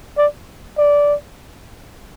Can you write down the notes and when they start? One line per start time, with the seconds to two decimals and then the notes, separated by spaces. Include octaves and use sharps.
0.18 D5
0.78 D5